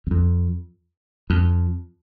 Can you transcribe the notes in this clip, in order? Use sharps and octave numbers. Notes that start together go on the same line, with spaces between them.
E2
F2
F2